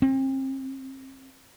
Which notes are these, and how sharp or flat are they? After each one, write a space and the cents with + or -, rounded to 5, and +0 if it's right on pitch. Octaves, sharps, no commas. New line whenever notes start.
C4 +35